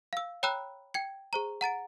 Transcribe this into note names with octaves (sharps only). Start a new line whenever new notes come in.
F5 E6
C#5 G5 A#5 B5 E6 F#6
G5 G#6 C#7
G#4 C5 A#5
F#5 A#5 A6 D7